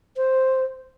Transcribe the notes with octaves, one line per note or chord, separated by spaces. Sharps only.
C5